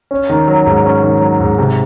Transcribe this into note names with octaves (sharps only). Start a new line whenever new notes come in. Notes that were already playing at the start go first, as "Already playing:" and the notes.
C#4
D#3
F#3
G#2
C#4
D#3
F#3
G#2
C3